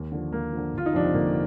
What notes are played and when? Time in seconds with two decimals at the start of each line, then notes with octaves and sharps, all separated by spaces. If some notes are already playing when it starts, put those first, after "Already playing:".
Already playing: D#2
0.12 D3 F3
0.32 D#2 A#3
0.53 D3 F3
0.73 G1 F4
0.86 D#4
0.93 F2 C3 F3 D4
1.04 C4
1.13 G1 A#3